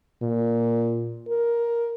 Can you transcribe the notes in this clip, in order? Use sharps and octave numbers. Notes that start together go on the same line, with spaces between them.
A#2
A#4